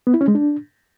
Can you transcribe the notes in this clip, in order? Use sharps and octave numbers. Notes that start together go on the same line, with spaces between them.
B3
E4
C#4
G#3
D4